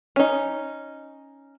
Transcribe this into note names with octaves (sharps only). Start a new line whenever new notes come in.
C#4 D#4